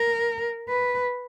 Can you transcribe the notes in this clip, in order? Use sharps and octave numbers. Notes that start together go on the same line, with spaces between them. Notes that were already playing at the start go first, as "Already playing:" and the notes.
Already playing: A#4
B4